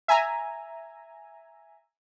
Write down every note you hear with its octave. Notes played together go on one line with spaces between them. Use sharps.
E5 G#5 A#5